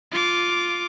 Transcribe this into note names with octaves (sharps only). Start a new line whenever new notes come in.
F4 D6